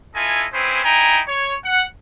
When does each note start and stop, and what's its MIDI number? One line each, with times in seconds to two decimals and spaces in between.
0.15 0.45 64
0.15 0.45 65
0.15 0.45 69
0.15 0.45 75
0.15 0.45 80
0.52 0.82 60
0.52 0.82 61
0.52 0.82 64
0.52 0.82 68
0.52 0.82 71
0.52 0.82 72
0.84 1.21 63
0.84 1.21 64
0.84 1.21 79
0.84 1.21 80
0.84 1.21 82
1.27 1.54 73
1.65 1.85 78